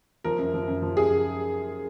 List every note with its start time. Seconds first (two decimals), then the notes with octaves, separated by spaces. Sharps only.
0.24 F3 A#4
0.39 F#2
0.54 F3
0.68 F#2
0.82 F3
0.97 G#4